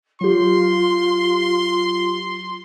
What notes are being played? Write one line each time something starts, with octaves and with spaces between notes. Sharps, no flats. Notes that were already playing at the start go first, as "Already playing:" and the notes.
F#3 F4 G4 C6